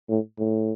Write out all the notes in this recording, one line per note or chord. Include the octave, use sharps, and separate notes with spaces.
A2
A2